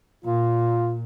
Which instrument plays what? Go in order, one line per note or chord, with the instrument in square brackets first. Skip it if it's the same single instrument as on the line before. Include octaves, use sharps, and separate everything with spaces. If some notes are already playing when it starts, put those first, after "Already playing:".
[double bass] A#2 [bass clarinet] F4